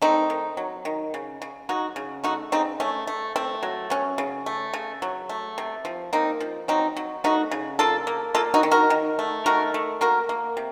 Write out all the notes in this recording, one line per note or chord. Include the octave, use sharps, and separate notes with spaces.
A3 C4 D#4
D#3
F#3
D#3
C#3
C#3
F#3 D#4 F#4
C#3
A3 D#4 F#4
C#3 C4 D#4
A3 C#4
A3
A3 C4
F#3
F#3 C#4
C#3
A3
C#3
F#3
A3
C3
F3
A#3 C4 D#4
F3
F#3 C4 D#4
F#3
A3 D#4 F#4
C#3
A#3 F4 A4
A#3
A#3 F4 A4
D#4 F#4
D#3
F#4 A#4
D#3
A3
D#3 F#4 A#4
A3
A#3 F#4 A#4
A#3
C3